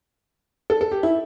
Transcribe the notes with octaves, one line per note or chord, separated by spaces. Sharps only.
A4
A4
G4
E4